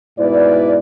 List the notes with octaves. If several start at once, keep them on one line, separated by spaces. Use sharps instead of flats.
G#2 B2 E4 B4 D5